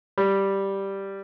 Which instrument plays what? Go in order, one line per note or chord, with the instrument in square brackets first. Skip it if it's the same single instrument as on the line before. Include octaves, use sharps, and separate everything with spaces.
[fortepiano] G3